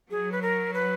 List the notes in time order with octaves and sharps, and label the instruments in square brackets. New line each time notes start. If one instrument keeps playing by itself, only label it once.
[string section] F#3 [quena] G#4
[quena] B4
A#4
B4